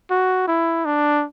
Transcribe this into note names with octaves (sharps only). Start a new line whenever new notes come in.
F#4
E4
D4